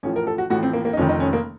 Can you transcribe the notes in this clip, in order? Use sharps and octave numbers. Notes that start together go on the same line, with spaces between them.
A1 A2 F3 C#4
A#4
A4
F#4
A1 A2 F3 F#4
C4
A#3
A#3
D#4
F1 F2 D#3 C#4
D#4
C#4
A#3